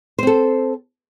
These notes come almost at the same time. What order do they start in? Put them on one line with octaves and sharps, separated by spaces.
C5 C4 A4